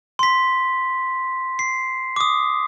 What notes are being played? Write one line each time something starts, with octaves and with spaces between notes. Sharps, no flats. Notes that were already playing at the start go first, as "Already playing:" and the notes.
C6 B6
C7
D6 D#6